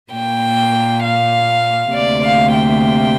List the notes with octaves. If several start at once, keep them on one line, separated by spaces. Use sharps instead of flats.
A#2 A#3 G5
F5
D2 C3 A#3 D5
F5
G5